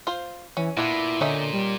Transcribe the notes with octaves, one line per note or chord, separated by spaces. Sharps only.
F4 C5
E3 C#4
A#2 B3 D4 E4 F4
D3 C#4 D#4 E5
G3